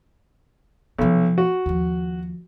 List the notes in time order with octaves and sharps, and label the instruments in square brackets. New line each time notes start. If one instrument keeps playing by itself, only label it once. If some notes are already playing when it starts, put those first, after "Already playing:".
[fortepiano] B1 [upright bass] C3 F3
[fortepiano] F#4
[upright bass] D#2 F3